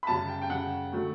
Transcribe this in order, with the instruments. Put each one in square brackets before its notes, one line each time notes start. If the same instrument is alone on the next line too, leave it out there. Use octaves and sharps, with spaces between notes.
[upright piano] B5
F#2 C#3 G3 A5
G5
G5
F#2 C#3 G3 F#5
D3 F#3 A3